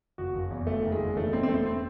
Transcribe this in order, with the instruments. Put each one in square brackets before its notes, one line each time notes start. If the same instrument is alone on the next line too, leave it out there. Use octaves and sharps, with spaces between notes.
[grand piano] F#1 F#4
F#1
E2
F#1 A3
D#3
G#3
F#1
E1 A3
E1 C4
C4
E1 A3
C4